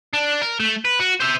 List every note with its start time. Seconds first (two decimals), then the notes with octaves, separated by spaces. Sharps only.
0.13 D4
0.42 A#4
0.60 A3
0.85 B4
0.99 F#4
1.20 C5 E5